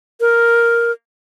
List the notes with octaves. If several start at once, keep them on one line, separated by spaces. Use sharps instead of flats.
A#4